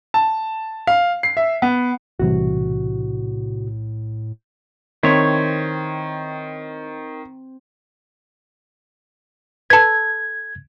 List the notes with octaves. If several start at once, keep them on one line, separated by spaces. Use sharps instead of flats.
A5
F5
C7
E5
B3
B1 A2 C3 E3 G3 F#4
D#3 C4 E4 C#5
A4 B4 G#6